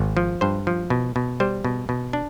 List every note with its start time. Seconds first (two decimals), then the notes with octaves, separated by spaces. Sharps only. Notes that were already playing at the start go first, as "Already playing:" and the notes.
Already playing: G#1
0.17 F3
0.41 G2 C5
0.67 F3
0.90 B2
1.16 B2
1.40 G3 C5
1.65 B2
1.89 B2
2.13 D4